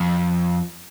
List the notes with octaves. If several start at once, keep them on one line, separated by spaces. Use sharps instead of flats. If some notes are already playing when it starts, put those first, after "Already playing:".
Already playing: F2